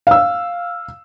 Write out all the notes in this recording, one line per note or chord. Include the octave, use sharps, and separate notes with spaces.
F5 E6